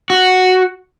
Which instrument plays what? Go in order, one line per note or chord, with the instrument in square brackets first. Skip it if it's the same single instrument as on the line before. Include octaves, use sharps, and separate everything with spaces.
[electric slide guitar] F#4